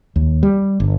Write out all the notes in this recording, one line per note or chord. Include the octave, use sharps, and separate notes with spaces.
D#2
G3
G1